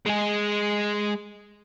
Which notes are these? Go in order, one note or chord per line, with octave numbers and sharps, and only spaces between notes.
G#3 G#4